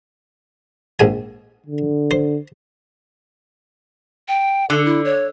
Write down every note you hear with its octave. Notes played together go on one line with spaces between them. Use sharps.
A#1 G#2 G#5
D3
C5
G5
D3 A4
E4
C#5